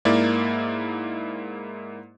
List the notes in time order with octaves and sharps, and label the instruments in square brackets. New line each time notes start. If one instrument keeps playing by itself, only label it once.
[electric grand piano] G#2 A#3 E4 D5